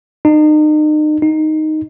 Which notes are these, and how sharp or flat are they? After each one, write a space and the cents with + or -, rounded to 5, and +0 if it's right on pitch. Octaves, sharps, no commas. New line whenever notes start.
D#4 -35
D#4 +0